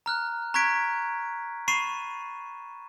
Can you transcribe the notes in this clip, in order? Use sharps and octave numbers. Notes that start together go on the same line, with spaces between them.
A#5 F6 F#6
A#5 C#6 F#6 G#6 B6 D7
B5 C#6 A6 C7 D#7 E7